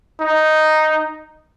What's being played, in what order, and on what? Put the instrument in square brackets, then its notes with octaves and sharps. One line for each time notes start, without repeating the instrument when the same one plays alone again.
[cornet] D#4